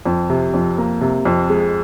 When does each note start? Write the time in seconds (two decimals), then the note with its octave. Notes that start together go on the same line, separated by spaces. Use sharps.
0.05 F2
0.30 C3
0.54 F2
0.78 A#3
1.01 C3
1.25 F2
1.50 G#3